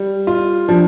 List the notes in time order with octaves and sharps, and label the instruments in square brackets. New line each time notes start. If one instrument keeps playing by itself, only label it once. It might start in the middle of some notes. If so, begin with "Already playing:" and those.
Already playing: [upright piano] G3
F4
[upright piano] F3 [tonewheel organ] D4